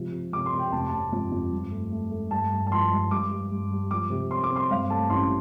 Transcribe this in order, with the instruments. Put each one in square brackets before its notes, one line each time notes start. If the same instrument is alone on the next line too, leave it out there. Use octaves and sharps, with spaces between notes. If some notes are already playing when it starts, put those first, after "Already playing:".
Already playing: [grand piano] C3 F3
C3
C3 D6
C6
C3
G5
F1 A5
C6
F1 A5
F2
F2
G2
A3
A3
A3
G2 A5
G2
A5
F3 C6
G2
G2 D6
G3
G2
G3
F3 D6
C3
C4 C6
D6
C4
C6
G2 F5
A3 A5
A1 C6